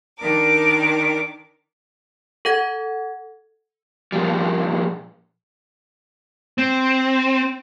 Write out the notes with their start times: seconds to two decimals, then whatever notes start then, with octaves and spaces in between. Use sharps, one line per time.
0.18 D#3 D4 A#4 D6
2.45 A4 F#5 G#6
4.12 A#2 F3 G3
6.58 C4